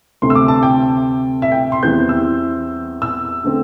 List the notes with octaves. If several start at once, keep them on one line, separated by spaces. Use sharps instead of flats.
D2 C3 A3 C4 C6
E6
D6
A5
G5
E5
G5
C6
E2 E3 G3 C4 G6
E6
E6
D3 A3 C4